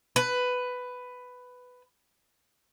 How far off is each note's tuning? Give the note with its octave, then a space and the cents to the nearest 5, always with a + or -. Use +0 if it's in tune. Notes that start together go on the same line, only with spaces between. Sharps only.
B4 +10